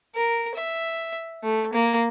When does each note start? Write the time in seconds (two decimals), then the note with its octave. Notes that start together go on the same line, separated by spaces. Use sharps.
0.15 A#4
0.55 E5
1.43 A3
1.73 A#3